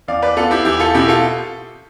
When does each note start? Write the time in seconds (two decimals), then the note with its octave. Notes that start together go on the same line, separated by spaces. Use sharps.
0.08 E2 D5 F5
0.22 B4 D5
0.36 B3 F4 A4
0.51 E4 G4
0.65 E2 E4 G4
0.80 F4 A4
0.94 B2 E4 G4
1.08 F4 A4